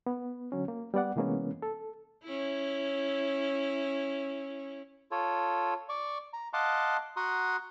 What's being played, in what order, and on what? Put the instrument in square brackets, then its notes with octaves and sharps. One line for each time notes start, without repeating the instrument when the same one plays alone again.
[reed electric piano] B3
D3 F#3 C#4
A#3
G3 B3 D5 F#5
C3 E3 G#3 A#3 B3 C#4
A4
[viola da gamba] C#4 E4
[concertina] F4 A4 C#5
D5 C#6
A#5
D#5 F5 F#5 A5 C6 D6
F#4 F#5 A#5 C6 D#6